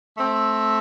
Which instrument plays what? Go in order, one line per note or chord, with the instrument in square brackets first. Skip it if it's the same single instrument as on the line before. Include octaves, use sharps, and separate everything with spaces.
[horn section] A3 C4